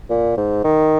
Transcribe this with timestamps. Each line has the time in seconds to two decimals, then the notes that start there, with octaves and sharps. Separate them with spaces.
0.10 A#2
0.38 G#2
0.65 D#3